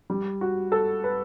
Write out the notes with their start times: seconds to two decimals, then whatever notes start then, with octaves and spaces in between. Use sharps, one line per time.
0.10 G3
0.41 F#4
0.72 A4
1.04 B4